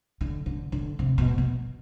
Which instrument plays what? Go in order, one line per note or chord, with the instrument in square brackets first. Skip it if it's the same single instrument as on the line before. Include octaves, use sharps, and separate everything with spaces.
[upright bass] D3
D3
D3
C3
B2
B2